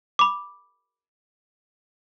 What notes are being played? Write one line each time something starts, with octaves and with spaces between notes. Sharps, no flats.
B5 D6